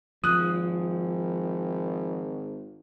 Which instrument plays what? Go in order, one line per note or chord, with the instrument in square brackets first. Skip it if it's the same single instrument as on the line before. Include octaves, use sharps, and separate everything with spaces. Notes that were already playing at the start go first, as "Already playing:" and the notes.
[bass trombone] G#1 [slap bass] F3 [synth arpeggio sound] D#6 F#6